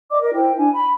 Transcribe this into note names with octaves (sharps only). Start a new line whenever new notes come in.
D5 D#5 D6
A#4
E4 C5 G5
D4 G#5
B5